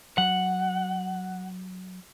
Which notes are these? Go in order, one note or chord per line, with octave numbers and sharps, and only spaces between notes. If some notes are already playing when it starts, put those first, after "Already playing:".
F#3 F#5